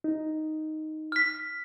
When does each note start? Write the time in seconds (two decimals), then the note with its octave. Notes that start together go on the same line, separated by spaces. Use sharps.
0.04 D#4
1.12 F6 B6